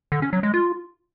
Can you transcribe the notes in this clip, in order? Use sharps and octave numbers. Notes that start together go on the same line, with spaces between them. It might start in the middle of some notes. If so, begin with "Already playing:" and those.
D3
C#4
F#3
G#3
F4